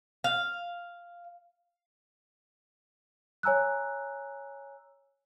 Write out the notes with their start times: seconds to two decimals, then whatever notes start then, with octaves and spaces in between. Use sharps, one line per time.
0.24 F5
3.43 C#5 G#5 A#5 E6 F#6